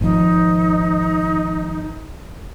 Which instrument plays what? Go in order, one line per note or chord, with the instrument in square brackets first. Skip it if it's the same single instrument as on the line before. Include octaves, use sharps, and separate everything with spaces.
[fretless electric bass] G#1 F3 [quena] D#4